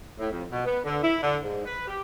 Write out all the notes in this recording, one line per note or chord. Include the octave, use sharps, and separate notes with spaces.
A2
F2
B2
B3
D3
E4
D3
G#2
B4
G4